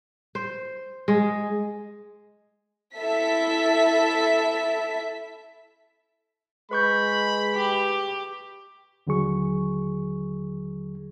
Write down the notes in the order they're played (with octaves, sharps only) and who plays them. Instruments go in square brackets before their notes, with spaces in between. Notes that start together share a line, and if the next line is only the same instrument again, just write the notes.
[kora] C5
G#3
[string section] E4 A4 E5 B6
[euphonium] G#3 [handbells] B4 C#6 G6 [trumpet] B5
[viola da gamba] G4
[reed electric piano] D#2 D3 F#3 G#4 C#6